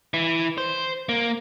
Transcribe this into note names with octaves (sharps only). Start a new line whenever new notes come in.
E3
C5
A#3